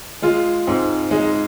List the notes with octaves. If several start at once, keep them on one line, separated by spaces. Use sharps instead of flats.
G#3 F4
G#2 C4
G#3 D#4